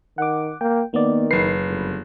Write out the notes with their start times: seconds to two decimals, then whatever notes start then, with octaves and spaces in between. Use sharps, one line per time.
0.18 D#3 F#5 D6
0.61 A#3 G5
0.94 D#3 A#3 B3 D5
1.31 F#1 B4 C7
1.68 G1